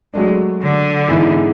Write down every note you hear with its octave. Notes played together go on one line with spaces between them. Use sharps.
F#3 G#3 A3 D4
D3
G#2 E3 B3 E4 G#4